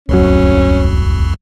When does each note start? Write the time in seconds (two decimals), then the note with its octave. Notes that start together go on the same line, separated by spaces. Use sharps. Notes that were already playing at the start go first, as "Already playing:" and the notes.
0.09 D1 C2 F2 F#3 C#4